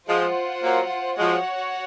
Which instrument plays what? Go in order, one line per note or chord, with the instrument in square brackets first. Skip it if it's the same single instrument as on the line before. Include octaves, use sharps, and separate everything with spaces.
[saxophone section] F3 G#3 [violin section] F4 C5 F#5
[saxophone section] F#3 A#3
[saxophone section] F3 G#3 [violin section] F#4 C#5 F#5